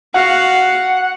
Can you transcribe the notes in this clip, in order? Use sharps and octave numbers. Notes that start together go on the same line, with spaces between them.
F#4 F5 F#5